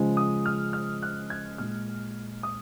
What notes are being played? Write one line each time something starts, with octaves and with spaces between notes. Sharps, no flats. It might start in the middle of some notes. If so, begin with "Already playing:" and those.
Already playing: C#3 F3 G#3
D#6
F6
F6
F#6
G#6
A#2 G#3 F6
D#6